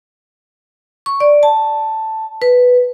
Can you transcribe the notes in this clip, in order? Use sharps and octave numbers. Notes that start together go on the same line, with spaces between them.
C#6
D5
A5
B4